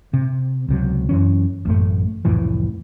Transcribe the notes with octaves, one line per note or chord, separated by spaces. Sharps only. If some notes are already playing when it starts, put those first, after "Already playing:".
C3
C#2 C3 F#3
F#2 E3 C#4
A1 F#2 A3
C2 F2 A2 E3